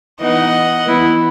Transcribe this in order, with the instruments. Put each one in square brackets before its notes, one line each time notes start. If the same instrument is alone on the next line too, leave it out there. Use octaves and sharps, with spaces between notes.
[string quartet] E3 B3 D#4 D#5 F#5
E3 B3 E4